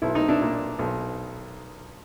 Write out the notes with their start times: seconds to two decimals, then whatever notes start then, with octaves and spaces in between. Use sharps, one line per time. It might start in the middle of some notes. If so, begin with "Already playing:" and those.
0.02 B1 E4
0.15 D#4
0.28 D4 E4
0.41 A#2
0.79 B1